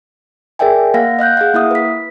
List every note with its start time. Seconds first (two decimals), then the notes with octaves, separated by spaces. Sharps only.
0.59 G#4 A#4 D5 E5 G5 G#5
0.94 A#3 F5 F#5 A#6
1.19 D#5 F5 F#6 G6
1.37 G#4 F5 F#5
1.54 A#3 E4 E5 D#6
1.71 B4 B6